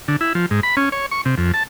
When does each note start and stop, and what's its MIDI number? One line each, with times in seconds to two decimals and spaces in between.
0.08 0.16 50
0.21 0.33 64
0.35 0.46 53
0.51 0.60 44
0.63 0.75 83
0.77 0.89 61
0.92 1.06 73
1.11 1.21 85
1.26 1.35 48
1.38 1.52 41
1.54 1.63 81